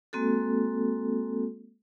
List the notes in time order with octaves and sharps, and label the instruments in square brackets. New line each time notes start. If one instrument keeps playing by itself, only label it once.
[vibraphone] G#3 A#3 C4 F#4 A4